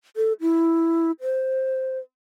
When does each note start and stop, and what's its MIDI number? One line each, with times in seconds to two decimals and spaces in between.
0.16 0.33 69
0.41 1.12 64
1.21 1.99 72